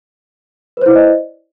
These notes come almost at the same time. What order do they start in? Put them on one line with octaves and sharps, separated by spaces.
B4 C5 E4 D5 D#5